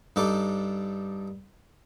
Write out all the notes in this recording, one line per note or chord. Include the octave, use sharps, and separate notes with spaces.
G2 D#4 A4 D6